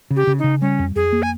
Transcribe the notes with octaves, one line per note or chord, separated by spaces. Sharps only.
C#3
G4
C#3
D#4
C#3
G3 C#4
F2
F2 G#4
A#3
G#5